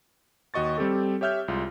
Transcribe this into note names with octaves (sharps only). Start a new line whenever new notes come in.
D#2 F#4 D#5 C#6 A6
G3 C4 G4 A4
G4 C#5 E5 F6 G6
C2 G#3 F4